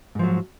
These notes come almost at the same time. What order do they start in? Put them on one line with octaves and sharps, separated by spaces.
G#2 F3 F#3